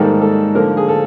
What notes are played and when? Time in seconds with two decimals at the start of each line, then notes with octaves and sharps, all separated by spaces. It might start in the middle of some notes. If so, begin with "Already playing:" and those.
Already playing: G#2 D#3 G3 A#3 A4
0.21 A4
0.55 D3 F3 A#3 A#4
0.77 G#4
0.88 A4